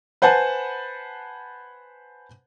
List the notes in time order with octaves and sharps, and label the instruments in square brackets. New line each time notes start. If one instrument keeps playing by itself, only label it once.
[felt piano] B4 C5 F#5 G#5 A5